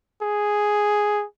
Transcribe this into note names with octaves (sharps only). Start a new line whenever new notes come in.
G#4